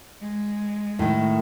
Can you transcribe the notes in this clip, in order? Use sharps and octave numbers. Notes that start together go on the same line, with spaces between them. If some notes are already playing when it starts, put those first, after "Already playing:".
G#3
A2 D#3